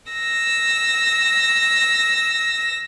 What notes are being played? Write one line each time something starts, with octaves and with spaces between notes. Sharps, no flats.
E6 A#6